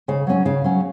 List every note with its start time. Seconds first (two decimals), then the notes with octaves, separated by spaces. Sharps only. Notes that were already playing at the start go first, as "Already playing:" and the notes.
0.08 C#3 F5
0.27 F#3 C#4
0.45 C#3 F5
0.64 F#3 C#4